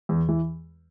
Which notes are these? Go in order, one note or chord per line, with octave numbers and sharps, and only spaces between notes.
E2
E3